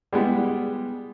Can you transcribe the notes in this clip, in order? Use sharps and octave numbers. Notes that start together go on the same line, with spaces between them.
G3 G#3 B3